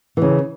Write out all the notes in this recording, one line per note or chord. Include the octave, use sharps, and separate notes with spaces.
C#3 E3